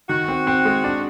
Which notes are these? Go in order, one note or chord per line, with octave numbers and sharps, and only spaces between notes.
D#3 F#4
C4
C4
G#3
D4